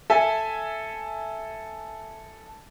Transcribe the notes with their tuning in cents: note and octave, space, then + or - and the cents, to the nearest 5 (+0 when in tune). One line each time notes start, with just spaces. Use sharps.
A4 +0 E5 +0 G#5 +0